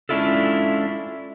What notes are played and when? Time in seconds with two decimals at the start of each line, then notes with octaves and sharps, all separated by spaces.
0.09 G#3 C#4 D4 E4 F4 A4